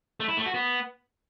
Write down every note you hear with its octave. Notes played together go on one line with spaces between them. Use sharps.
A3
E4
A3
F#4
B3